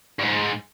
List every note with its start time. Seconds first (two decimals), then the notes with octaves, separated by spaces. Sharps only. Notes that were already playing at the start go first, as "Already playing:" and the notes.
0.20 G2
0.23 G#2